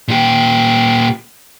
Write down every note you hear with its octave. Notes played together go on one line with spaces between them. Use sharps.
A#2 G4